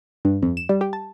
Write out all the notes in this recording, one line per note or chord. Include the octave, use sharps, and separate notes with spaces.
G2
F2
E7
G3
G4
A5